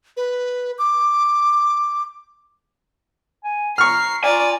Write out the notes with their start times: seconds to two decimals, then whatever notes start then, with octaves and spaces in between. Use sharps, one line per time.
0.17 B4
0.78 D6
3.44 G#5
3.78 A#5 C#6 F6 C7
4.24 F4 D5 G#5 A#5